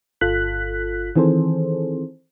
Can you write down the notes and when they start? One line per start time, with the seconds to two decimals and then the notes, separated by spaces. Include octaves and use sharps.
0.21 G1 F4 A4 F#6 B6
1.16 D#3 E3 C4 G#4 A4 C5